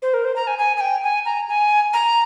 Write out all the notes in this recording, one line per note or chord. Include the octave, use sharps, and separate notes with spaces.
C5
A#4
C5
A#5
G#5
G#5
G#5
G5
G#5
A#5
G#5
A#5